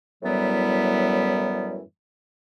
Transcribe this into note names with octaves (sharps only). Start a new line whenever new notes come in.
F#2 A2 E3 F#3 G3 B3